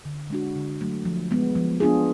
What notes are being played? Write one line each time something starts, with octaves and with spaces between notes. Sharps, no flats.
D3
G#3 D4 F#4
D3
F#3 A3
F3
G#3 B3
F3
B3 D4 F4 G#4